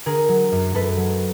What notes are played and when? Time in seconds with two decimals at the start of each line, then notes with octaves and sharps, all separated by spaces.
0.06 D3 G#4 A#4
0.29 F#3
0.52 F#2
0.74 F#2 A4 B4
0.97 F#3